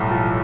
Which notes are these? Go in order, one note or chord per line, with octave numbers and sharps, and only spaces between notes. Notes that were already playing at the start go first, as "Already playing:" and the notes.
Already playing: B1 A2 G3
F3